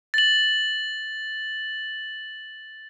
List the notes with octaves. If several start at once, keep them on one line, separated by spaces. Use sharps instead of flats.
A6 F#7